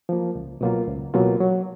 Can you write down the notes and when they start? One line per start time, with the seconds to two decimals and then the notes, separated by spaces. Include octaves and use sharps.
0.09 F3 A#3
0.35 C#2
0.61 B2 F#3 A#3 F4
0.87 C#2
1.14 B2 F#3 A#3 F4
1.40 F#3